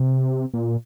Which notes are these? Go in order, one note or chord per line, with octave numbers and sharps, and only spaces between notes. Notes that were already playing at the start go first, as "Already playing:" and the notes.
Already playing: C3
A#2